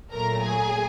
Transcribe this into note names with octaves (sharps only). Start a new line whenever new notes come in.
A#2 F#3 A3 A#4 A#5
G#4 G#5